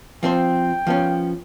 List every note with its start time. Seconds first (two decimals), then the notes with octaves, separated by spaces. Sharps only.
0.23 F3 C4 C5 G5
0.87 F3 B3 C#4